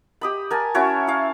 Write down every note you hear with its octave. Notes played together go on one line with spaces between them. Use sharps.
G4 D#5 B5
A#4 G#5 A5
C#4 E4 F#4 C#5
E4 F5